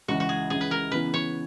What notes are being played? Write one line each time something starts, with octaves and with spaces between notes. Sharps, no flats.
C#2 C#3 E3 F#4
F#4
G#4
C#2 C#3 E3 G#4
B4
A#4
C#3 E3 B3 E4 B4
C#5